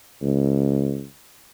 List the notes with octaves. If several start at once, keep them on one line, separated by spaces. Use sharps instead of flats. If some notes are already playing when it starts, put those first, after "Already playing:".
C#2